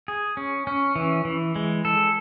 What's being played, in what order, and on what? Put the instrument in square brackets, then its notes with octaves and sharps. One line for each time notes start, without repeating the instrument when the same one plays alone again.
[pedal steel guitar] G#4
C#4
C#4
E3
E3
G#3
A4